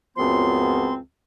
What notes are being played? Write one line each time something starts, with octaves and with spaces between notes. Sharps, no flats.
C#2 F#2 F3 B3 C4 C6